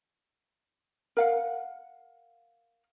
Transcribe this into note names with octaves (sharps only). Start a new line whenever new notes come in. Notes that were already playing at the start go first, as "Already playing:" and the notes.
A#4 F5 F#5